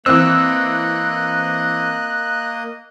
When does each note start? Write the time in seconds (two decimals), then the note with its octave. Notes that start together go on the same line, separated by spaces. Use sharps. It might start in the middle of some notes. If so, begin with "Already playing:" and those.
0.06 E3 A#3 C4 D#5 E6 F#6